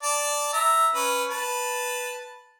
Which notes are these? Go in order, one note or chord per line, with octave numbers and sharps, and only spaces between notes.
D5 A5
E5 A#5
C#4 B4
B4 A5